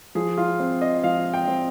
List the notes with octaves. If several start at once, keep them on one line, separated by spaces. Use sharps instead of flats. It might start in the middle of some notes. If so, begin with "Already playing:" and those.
F3 G#4
F4
C4
D#5
F3 F5
G5
C4